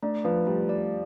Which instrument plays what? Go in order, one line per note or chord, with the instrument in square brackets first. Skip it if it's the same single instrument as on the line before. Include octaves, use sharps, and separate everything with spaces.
[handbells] A3 [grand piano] D4
[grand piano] F3 [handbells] B4
[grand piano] G3 [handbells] A3
[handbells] D5